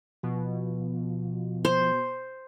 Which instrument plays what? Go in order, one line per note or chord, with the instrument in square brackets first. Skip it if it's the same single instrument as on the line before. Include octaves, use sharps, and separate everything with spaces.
[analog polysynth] B2 [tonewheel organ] F3
[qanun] C5